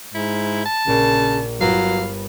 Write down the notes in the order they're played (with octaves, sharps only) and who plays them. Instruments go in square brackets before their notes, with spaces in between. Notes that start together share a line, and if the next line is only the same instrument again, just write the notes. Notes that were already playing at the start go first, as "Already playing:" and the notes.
[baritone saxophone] G#2 [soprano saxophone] E4
[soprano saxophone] A5
[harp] A#1 [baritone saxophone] C#3
[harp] G1 B4 D#7 [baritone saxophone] F#3 [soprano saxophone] F5